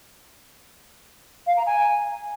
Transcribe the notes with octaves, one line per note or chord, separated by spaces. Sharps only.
F5
A#5
G#5